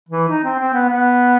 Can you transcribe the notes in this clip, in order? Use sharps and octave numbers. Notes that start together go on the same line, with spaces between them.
E3
D#4
C4
C4
B3
B3